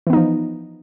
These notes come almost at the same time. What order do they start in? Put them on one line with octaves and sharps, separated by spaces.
E3 B3 D#4 F3